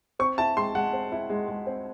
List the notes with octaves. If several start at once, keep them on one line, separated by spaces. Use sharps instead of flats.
C4 C#6
E4 A5
G#3 C6
G#3 F#5
C4
E4
G#3
G#3
C4